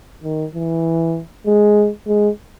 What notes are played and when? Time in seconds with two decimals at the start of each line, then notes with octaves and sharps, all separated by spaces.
0.23 D#3
0.55 E3
1.46 G#3
2.07 G#3